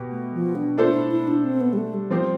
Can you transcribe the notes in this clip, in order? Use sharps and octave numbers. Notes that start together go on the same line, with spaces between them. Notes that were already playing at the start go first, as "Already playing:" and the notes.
Already playing: B2 G4
A3
F3
D4
A3 D4 F4 A4 C5
E4
E4
D4
C4
B3
G3
A3
G3
F3 C4 G4 C5